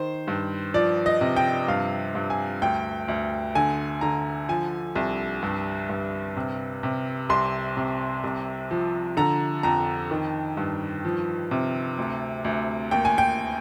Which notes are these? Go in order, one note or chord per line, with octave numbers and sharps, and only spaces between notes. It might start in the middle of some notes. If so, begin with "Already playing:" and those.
Already playing: D#3 C5
G2
F3 D5
D#5
C3
G5
G2 F5
G2
G#5
D2 G5
D2
D3 G#5
D3 A#5
F3 G#5
C2
G2
G2
C3
C3
C2 C6
C3
C2
F3
D3 A#5
F2 A#5
D#3
G2
F3
C3
D2
D2
D#2 G5
G#5
G5